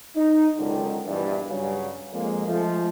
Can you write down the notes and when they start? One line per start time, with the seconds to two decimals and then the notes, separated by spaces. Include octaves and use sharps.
0.16 D#4
0.57 C#2 F#2 D3 D#3
1.06 A#1 G2 B2 E3
1.49 G2 C#3 F#3
2.13 F2 G#3 A#3
2.47 F3 G#3 A3